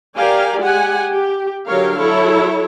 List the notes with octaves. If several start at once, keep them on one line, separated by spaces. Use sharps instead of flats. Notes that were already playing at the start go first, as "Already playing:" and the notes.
G4 A#4 D5 F5 G#5
G#3 G4 F#5 G#5
G4
D3 F#3 G4 A#4 C#5 F5
F#3 E4 A4 C#5